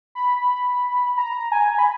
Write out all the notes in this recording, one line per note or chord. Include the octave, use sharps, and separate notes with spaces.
B5
A#5
G#5
B5